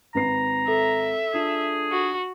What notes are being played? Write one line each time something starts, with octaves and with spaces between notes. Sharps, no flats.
G#1 B4 A#5 C7
A4 E5
D4 F4 G#4
F#4